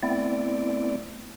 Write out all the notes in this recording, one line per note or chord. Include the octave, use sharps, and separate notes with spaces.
A3 B3 C4 E4 D5